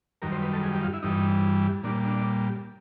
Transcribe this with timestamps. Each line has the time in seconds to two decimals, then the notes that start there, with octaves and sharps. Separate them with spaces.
0.22 F#2 D#3 G3 A#4
0.32 C5
0.42 B4
0.53 A4
0.63 G#4
0.73 G4
0.82 F4
0.94 E4
1.03 G2 E3 G3 D#4
1.84 A#2 G3 D4
2.05 D4